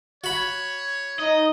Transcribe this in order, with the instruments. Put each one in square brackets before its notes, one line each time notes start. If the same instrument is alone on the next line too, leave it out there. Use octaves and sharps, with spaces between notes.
[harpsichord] F#4 B5 [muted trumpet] C#5
[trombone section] D#4 [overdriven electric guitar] D#5